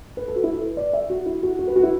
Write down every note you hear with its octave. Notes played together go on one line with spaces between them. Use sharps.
B4
A4
F#4
E4
A4
B4
D5
E5
F#4
E4
F#4
F#4
B4
F#4
E4